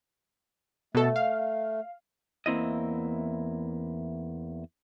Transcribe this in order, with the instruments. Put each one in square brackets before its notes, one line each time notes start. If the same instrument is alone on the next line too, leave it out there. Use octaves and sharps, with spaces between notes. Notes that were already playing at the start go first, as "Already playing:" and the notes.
[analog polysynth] B2 A4 [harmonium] A3
[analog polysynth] F5
[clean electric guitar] E2 A#3 C4 E4 D#5